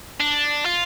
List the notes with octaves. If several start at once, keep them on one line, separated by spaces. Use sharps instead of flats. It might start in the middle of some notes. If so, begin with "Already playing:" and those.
D4
F4